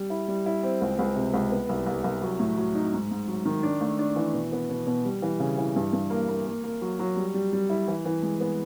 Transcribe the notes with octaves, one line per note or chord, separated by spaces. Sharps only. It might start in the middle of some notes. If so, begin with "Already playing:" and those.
Already playing: G3
E4
G3
E4
C4
C#2
C#2
C3
C#2
B3
C2
C2
C2
F#3
A2
F#3
D#4
G#2
G#2
F#3
D#3
D4
A3
D4
E3
B2
B3
B2
B2
G3
E3
C#3
E3
G2
G2
A#3
A#3
A#3
A#3
F#3
F#3
G3
G3
G3
E4
E3
E3
G#3
B3